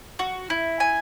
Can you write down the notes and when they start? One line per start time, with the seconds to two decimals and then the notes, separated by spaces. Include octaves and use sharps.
0.19 F#4
0.50 E4
0.80 G#5